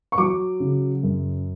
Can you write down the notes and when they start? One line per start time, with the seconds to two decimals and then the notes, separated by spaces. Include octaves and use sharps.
0.12 C#6
0.18 F#3 D6
0.60 C#3
1.03 F#2